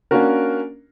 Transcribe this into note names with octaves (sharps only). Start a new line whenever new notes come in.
A#3 C#4 D4 F#4 A#4